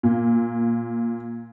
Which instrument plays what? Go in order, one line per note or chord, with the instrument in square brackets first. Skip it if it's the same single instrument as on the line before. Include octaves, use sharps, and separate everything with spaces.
[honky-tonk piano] A#2